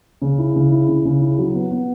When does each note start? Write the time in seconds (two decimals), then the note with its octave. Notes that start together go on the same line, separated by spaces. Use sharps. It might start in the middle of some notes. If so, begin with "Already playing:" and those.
0.22 C#3
0.39 E4
0.56 C#3
0.72 E4
0.89 C#3
1.05 C#3
1.22 E4
1.38 F#3
1.55 B3
1.71 B3